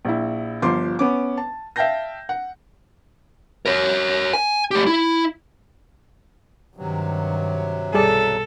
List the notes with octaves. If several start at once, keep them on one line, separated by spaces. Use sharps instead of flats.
A#1 E4
G1 F3 C6 D6
B3 C#4 D6
A5
E5 F5 G5 A5 G6 A#6
F#5
A#4 C#5
G#5
A3 G4
E4
G2 C3 D#3 F#3
B1 G3 G#4 A4 D5